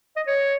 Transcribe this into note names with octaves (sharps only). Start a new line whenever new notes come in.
D#5
C#5